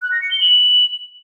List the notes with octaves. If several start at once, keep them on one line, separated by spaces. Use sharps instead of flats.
F#6
A#6
C#7
G7
F#7